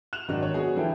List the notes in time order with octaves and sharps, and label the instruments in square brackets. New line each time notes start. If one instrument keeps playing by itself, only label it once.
[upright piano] F#6 E7 F7
G#2 D#3 F#3 D4 F#4
C#5
B3 F#4 G#4
D3 E3 F3 E4 A4 G5